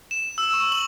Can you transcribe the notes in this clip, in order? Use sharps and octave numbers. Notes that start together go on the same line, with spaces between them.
E7
E6
C#6
F#7